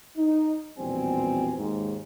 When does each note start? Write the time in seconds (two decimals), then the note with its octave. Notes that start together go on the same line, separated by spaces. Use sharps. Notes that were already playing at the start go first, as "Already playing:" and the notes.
0.18 D#4
0.79 A#1 E2 B2 G3 C4 G#5
1.58 D#2 G#2